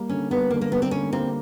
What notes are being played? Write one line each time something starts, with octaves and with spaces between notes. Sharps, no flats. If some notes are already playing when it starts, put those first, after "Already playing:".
Already playing: G3 A#3
D3 C#4
G3 A#3 B3
D3 A#3
A#3
G3 A#3 B3
C4
D3 C#4
G3 A#3 C4